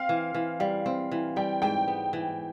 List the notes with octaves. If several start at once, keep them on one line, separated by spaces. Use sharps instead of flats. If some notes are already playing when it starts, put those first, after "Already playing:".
Already playing: C4 F5
E3
E3
G3 F5
C4
E3
G3 G5
G#2 G5
B3
E3